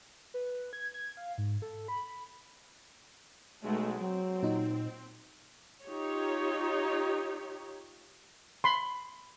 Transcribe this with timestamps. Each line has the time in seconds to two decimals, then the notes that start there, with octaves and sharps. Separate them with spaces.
0.34 B4
0.73 G#6
0.94 G#6
1.17 F5
1.38 G#2
1.62 A4
1.88 B5
3.63 B1 G#3 A3 F#4
3.99 F#3 C4
4.43 A#2 D#4
5.85 D#4 F4 G4 C#5
8.64 B5 C6